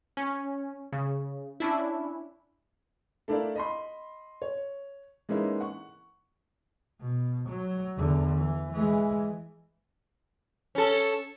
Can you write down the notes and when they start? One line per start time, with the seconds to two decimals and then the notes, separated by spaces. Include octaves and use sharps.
0.17 C#4
0.92 C#3
1.60 C#4 D4 E4
3.28 A3 D4 E4 A#4 D5 F5
3.56 D#5 B5 C6
4.42 C#5
5.29 E3 G#3 A#3 C#4 D#4 E4
5.60 F#5 C#6
7.01 B2
7.49 F#3
7.98 E2 D3
8.38 E3
8.73 E3 G#3
10.75 C#4 A4